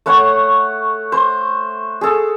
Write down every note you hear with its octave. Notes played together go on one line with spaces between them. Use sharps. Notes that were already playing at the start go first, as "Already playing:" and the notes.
A3 C#5 F#5
C5
G#4 A4